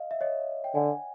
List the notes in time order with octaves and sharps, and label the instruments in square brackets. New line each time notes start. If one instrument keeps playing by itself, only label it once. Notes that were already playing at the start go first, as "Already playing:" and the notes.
Already playing: [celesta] D#5 F5
E5
C#5 D#5
G5
[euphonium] D3 [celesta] F#5 G#5